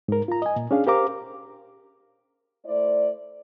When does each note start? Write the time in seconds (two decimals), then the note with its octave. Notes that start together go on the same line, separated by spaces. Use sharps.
0.08 G#2 A#4
0.28 F4 A#5
0.42 D#5 G#5
0.56 A#2
0.71 C#4 D4 G#4 F5
0.87 G4 A#4 C5 F5 A#5 D6
2.66 A3 E4 C5 D5